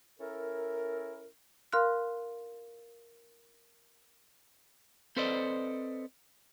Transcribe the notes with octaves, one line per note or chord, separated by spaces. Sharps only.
C#4 E4 A4 A#4
A#4 F5 C6 F6 F#6
C4 A4 B4 C5 D5 D#5